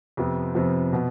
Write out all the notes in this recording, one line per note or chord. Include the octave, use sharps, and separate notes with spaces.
F2 C3 F3 B3
F2 C3 F3 B3
B2 B3